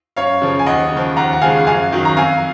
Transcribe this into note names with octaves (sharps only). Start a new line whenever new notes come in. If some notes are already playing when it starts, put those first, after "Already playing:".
F#2 C#5 F5
C#3 F3
G#5
D#2 D#5 F#5
C#3
F3
D#2 F#5 A#5
F#5
C#3 F3 G#3 F5 G#5
F#2 F5 G#5
D#3 F#3
A#5
F2 F5 G#5